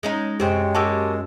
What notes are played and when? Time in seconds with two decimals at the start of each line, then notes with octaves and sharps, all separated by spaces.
0.03 G#3 C#4 D#4
0.40 F#2 C3 G#3 C4 G4 G5
0.75 A#3 F#4 G4 A5 C#6 E6